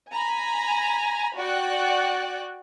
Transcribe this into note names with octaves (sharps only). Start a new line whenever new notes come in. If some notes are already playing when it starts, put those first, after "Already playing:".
G#5 A#5 B5
F#4 D5 G5 F#6